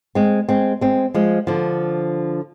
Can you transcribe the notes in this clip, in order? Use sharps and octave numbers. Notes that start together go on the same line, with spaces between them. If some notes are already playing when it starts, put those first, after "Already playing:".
G#3 C4
G#3 C4
G#3 C4
F3 G#3
D3 F3